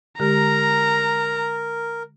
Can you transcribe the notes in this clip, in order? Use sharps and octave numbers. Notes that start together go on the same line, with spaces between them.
D3 G#3 G4 A#4 A#5